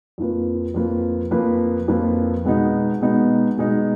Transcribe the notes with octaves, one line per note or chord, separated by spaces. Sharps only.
F2 F3 A#3 F4 B4
F2 F3 A#3 F4 B4
F2 F3 A#3 F4 B4
F2 F3 A#3 F4 B4
B2 G#3 B3 D#4
B2 G#3 B3 D#4
B2 G#3 B3 D#4